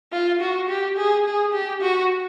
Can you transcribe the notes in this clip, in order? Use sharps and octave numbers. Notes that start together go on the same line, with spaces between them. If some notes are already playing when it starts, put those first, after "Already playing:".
F4
F#4
G4
G#4
G#4
G4
F#4